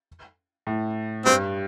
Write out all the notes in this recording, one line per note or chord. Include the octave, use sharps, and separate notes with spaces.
A2
G2 C4